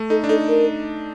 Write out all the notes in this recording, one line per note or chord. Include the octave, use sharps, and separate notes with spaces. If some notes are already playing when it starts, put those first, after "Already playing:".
Already playing: A3
D#4 A4
D4
D#4 A4
A#4